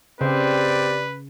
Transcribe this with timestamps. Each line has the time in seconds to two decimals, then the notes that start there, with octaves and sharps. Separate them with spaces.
0.21 C#3 C4 G4 B4 D5